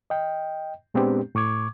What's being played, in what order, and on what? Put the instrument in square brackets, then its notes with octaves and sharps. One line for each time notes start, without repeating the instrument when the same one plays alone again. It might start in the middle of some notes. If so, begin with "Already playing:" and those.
[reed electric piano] D#5 G5
A#2 G#3 B3 C4 D4 G4
A2 C#6 D6 G#6